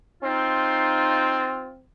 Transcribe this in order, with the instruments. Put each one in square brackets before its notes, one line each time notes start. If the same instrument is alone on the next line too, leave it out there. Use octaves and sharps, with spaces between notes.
[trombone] C4 [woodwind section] D#4 F4